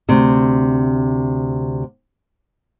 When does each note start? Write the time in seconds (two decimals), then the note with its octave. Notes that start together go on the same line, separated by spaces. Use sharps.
0.09 D2 C3